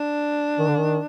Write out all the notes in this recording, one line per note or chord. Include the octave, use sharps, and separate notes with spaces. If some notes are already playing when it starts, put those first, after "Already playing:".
Already playing: D4
D#3
D3
D#3